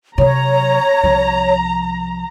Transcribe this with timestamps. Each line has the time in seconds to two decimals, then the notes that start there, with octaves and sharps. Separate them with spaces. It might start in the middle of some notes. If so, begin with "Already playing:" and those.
0.18 C3 F#3 C#5 A#5
1.04 C2 F3